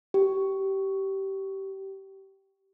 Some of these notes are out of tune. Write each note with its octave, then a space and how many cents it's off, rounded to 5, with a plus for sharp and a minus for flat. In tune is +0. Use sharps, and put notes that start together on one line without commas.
G4 -20